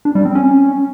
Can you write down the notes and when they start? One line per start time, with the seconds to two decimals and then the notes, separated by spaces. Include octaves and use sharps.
0.05 D4
0.15 G3
0.25 C4
0.35 C#4